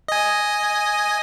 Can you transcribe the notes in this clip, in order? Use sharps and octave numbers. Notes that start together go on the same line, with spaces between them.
D#5 G#5